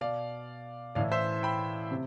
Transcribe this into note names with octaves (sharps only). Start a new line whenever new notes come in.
B2 D5 F5
A2 E3 D5 F5
C5 E5
G5 B5
C3